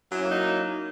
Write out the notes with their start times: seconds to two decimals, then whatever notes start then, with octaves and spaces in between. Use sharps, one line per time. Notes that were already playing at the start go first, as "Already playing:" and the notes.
0.10 F#3
0.15 E4
0.20 C#4
0.25 A#3
0.30 D#4